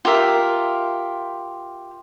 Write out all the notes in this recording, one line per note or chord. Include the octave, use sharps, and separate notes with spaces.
F4 G4 A#4 E5